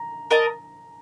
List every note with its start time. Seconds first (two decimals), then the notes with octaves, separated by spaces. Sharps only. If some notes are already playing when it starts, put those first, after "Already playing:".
Already playing: A#5
0.31 A#4 D#5 A5